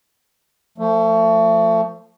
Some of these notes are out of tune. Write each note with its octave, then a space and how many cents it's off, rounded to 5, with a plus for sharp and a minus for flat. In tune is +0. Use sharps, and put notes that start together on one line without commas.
F3 +0 A3 +30